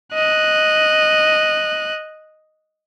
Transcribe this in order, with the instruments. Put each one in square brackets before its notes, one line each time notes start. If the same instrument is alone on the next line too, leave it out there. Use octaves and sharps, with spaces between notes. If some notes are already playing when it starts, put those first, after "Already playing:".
[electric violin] D#5 F#6